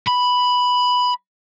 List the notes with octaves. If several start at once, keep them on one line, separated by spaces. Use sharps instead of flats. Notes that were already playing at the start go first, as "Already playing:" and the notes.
B5